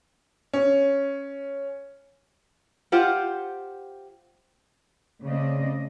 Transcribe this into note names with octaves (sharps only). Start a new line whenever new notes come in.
C#4
F4 G4 C5 F#5
C#3 A3 C4 D5 D#5